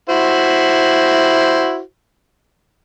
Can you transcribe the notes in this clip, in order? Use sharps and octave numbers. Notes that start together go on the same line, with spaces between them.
E4 F#4 C5